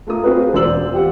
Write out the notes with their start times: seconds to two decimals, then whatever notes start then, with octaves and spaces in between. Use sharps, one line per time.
0.07 A3 F4 A#4 D#6
0.24 C4 F4 F#4 G#4 A#4 B4
0.53 E1 C5 D5 E6 F#7
0.92 F4 G4 F#5